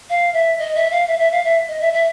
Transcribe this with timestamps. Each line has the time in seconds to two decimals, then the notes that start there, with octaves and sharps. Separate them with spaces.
0.10 F5
0.33 E5
0.59 D#5
0.75 E5
0.91 F5
1.08 E5
1.19 E5
1.32 F5
1.44 E5
1.68 D#5
1.81 E5
1.93 E5